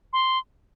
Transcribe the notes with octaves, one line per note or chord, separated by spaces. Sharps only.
C6